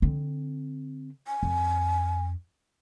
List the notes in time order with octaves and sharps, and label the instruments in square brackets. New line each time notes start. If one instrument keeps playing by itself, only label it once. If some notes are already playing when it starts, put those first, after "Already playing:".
[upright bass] D3 C4
[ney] G#5
[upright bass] F2